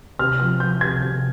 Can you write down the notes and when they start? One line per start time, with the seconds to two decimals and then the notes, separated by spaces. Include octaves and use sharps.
0.19 C3 F6
0.40 F3 F6
0.60 F3 G6
0.81 C3 G#6
1.02 C3